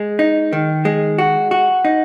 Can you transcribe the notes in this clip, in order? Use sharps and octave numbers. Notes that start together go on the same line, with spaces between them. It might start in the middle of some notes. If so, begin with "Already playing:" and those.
Already playing: G#3
D#4
D#3
G#3
F#4
F#4
D#4